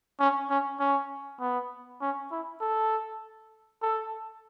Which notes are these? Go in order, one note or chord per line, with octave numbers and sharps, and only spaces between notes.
C#4
C#4
C#4
B3
C#4
E4
A4
A4